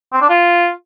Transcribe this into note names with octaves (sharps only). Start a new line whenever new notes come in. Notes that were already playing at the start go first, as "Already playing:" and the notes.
C4
D4
F4